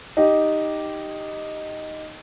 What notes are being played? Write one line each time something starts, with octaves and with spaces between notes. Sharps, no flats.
D#4 G4